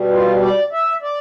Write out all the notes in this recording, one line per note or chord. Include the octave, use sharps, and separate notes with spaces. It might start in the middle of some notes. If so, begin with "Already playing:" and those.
Already playing: B2 G3
F4
D5
E5
D5